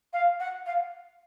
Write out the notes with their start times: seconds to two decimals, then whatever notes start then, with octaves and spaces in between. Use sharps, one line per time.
0.13 F5
0.39 F#5
0.66 F5